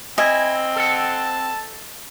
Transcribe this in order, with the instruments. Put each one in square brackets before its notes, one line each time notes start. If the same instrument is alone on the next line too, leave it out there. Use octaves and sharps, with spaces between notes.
[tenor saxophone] C4 [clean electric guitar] E4 [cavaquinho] D#5 G#5
[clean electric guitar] A4 F#5 [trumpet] A5